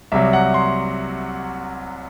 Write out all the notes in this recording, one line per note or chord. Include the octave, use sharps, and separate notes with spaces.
C2 C3 F#3 E5
F#5
C6